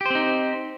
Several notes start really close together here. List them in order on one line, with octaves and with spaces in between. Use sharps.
G4 C5 C4 D#4